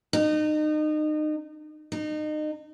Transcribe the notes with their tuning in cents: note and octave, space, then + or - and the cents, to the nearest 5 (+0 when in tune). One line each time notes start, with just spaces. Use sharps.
D#4 -30
D#4 -30